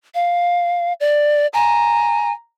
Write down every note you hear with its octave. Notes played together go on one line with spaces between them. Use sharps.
F5
D5
G#5 A#5